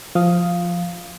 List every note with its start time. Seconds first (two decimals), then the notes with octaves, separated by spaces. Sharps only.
0.15 F3 F5 D#6